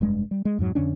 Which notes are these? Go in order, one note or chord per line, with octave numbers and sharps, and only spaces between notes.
F1 G2 G#3
G3
G#3
F2 G#2 F#3
F2 D3 C#4 D4